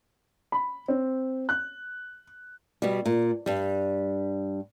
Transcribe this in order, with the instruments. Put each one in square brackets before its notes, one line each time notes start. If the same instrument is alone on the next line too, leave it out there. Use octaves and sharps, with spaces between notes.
[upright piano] B5
C4
F#6
[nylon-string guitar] B2 G3
A#2
G2 G3